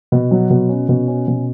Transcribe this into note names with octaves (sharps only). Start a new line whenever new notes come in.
B2
F#3
B2
C#4
B2
C#4
B2